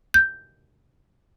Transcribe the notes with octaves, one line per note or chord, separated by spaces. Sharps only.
G6